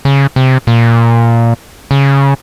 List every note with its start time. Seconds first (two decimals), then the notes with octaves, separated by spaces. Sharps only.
0.05 C#3
0.36 C3
0.67 A#2
1.91 C#3